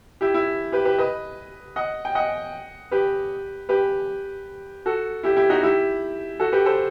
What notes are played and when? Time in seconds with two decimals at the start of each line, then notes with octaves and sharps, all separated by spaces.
0.21 E4 G4
0.34 E4
0.72 G4 B4
0.85 G4 B4
0.98 B4 D#5
1.76 D#5 F#5
2.05 G5
2.15 D#5 F#5
2.91 G4 B4
3.69 G4 B4
4.86 F#4 A4
5.23 E4 G4
5.37 E4 G4
5.49 D#4 F#4
5.63 E4 G4
6.40 F#4 A4
6.52 G4 B4
6.66 A4 C5